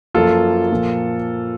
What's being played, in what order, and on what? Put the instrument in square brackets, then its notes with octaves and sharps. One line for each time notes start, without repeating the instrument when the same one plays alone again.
[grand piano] F#2 F3 A#3 F4 A4
A#2 F3 A#3